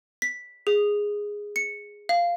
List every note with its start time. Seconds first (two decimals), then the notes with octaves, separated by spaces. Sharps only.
0.22 B6
0.67 G#4
1.56 C#7
2.09 F5